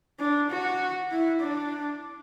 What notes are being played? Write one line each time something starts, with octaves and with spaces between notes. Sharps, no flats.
D4
F#4
E4
D4